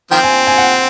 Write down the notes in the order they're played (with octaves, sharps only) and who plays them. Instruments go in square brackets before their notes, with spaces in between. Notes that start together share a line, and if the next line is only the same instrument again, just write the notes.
[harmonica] D#3 F3 C4 [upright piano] G5
[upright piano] G#5
G#5
F#5